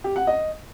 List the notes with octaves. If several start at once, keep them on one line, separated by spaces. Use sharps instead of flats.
G4
F#5
D#5